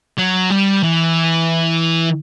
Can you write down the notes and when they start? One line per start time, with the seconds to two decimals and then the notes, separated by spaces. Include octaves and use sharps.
0.18 F#3
0.51 G3
0.83 E3